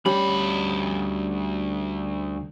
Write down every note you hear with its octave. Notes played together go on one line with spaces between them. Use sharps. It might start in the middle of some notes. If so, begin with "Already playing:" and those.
D2 G3 C#4 G4 B5